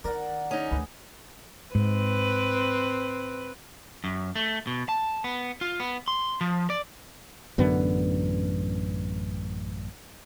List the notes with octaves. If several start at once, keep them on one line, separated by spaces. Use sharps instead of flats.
D#3 A#4 D5 F#5
C#4 D#4 G#4
D2 E3 B4
G#2 C4 B4
F#2
A3
B2
A5
B3
F4
B3
C6
F3
D5
A1 F#2 D3 B3